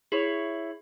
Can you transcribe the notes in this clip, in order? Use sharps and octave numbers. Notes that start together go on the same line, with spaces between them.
E4 G#4 C#5